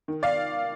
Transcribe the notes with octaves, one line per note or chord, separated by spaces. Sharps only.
D#3
D5 F5